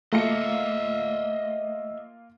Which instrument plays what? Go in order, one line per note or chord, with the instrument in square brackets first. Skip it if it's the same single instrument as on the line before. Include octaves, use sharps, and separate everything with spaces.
[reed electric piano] A3 [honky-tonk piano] A#3 F4 C#7 [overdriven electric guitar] D#5 E5